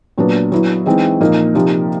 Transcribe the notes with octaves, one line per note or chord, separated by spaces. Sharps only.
A#2 F#3 B3 D4
F#3 B3 E4
E3 G#3 C4 D#4
A#2 F3 A#3 D#4
C3 F3 A#3 D#4